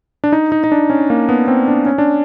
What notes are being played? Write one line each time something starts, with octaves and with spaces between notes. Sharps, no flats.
D4
D#4
D#4
D#4
D4
C#4
A#3
B3
C4
D4
C#4
D4